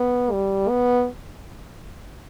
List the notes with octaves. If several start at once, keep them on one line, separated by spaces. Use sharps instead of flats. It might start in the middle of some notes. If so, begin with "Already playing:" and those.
Already playing: B3
G3
B3